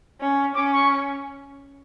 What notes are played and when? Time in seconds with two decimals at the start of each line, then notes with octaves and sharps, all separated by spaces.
0.21 C#4
0.55 C#4 D6
0.73 C#6